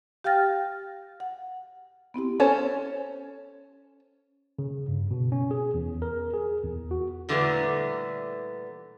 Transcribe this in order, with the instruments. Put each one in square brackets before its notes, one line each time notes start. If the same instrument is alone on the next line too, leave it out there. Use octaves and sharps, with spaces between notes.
[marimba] G4 F5 G5 F6 A6 A#6
F#5
B3 C4 E4 G4
[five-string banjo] C#4 A4 C5 C#5
[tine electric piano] C#3
G2
B2
C#4
G#4
E2
A#4
G#4
E2
F#4
[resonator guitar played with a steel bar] A#2 D3 E3 G3 A3 B3